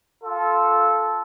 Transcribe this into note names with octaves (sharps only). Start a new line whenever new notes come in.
F4 A4